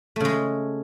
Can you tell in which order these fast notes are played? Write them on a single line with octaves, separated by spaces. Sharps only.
A3 C#3 G#3